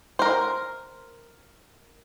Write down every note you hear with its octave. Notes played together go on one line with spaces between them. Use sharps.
A#4 C5